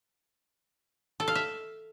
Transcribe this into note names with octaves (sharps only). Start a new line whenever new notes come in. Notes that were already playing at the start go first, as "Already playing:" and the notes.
A4
F5
E5